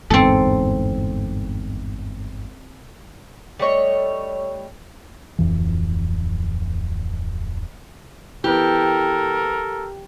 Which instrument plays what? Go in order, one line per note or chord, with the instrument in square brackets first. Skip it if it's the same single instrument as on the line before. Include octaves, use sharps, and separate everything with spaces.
[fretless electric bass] G1 E2 G#2 [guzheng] C4 A4
[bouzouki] G3 A3 C#5 D#5
[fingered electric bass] D1 C2 F2 E3
[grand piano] E3 B3 [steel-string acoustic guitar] G4 [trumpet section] A4 A#4